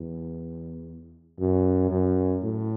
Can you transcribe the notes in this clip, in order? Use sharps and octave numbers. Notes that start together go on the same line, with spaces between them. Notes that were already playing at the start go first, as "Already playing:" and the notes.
Already playing: E2
F#2
F#2
A2